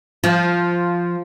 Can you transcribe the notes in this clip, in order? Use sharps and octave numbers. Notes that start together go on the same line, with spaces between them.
F3